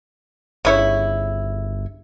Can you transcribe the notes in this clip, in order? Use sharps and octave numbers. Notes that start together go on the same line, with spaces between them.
G1 C#3 E4 C#5